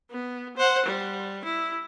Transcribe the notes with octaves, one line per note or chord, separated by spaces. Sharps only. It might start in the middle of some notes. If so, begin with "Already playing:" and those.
B3
C5 F#5
G3
E4